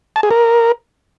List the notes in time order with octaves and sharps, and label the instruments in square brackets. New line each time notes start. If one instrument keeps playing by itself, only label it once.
[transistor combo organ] A5
G#4
A#4